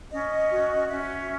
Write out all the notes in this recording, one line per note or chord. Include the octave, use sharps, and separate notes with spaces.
C#4 D#5
F#4
C#4 E5